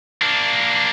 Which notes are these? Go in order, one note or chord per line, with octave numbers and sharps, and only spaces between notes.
A#3 D4